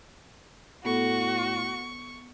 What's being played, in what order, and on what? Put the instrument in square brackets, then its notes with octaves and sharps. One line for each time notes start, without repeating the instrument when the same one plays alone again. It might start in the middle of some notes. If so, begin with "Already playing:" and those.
[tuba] A2 [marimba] B3 A4 [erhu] F#4 [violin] C#6